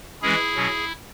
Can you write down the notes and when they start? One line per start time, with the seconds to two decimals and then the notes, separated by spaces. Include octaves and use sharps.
0.22 E3 G#3 C#4 E4 G#4
0.55 B2 F#3 C#4